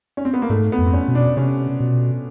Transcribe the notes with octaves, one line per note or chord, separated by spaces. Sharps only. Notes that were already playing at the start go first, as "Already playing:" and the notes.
C#4
C4
B3
A#3
G#2 A3
B3
F2
C4
C#4
B2
D4
C3 C#4
B2